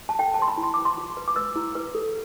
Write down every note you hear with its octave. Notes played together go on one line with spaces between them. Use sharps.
A5
A4 G5
A5
C5 C6
B5
E4
C6
B4 D6
C6
F4
B4
D6
B4 E6
E4
B4
A4